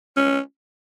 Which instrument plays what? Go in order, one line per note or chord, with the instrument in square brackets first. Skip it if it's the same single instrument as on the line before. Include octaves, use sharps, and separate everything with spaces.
[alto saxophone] C#4